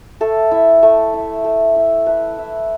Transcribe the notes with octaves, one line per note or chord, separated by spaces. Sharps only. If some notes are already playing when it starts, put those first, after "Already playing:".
A3 A4
E4
A3
E4
A3
E4
A3 B4
E4